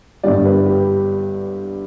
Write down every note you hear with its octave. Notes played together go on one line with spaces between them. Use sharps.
G1 G2 D3 G3 D5
B4
G4